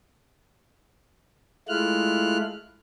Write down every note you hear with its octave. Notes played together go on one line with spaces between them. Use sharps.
G#3 A3 E4 F4 F6 F#6